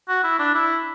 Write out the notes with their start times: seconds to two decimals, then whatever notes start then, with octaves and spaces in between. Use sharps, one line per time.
0.08 F#4
0.24 E4
0.39 D4
0.54 E4